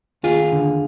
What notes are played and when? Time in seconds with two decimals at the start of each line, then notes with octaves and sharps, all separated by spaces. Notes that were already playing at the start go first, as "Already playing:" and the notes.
0.23 D#2 F4 G#4
0.52 D3